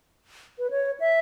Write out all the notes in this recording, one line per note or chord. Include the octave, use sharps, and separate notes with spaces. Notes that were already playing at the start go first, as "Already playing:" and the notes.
B4
C#5
E5